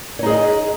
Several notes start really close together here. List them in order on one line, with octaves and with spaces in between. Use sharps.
C#5 D#4 G#4 D#5